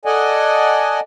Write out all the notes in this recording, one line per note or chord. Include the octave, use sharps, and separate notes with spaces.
A4 D5 D#5 F#5 G#5